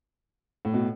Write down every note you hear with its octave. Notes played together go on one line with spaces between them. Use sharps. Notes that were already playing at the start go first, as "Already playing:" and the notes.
A2
B2